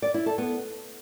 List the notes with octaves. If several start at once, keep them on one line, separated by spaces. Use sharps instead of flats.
D5
E4
A4
B3